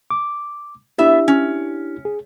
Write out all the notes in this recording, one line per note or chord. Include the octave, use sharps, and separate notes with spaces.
D6
B3 D4 E4 G4 E5
C#4
G#4